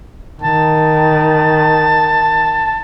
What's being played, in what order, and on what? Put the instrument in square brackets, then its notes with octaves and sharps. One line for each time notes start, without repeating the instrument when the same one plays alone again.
[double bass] D#3 [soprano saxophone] A5